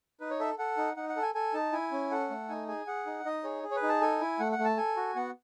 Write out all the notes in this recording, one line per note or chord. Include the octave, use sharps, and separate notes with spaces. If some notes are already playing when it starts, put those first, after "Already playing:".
D#4 B4
C#5
A4 E5
A4 F#5
D#4
D#4 F#5
F#5
A4
G#5
A4 G#5
D#4 A5
E4 G#5
C#4
A4 F#5
A3
D#4 G#5
G#4 G#5
G#4 F#5
D#4
D#4 D#5
G#4 C#5
G#4
C#5
B4
D#4
A5
A4 G#5
E4
A3 F#5
F#5
A3
A5
A4 G#5
F#4
B3 F#5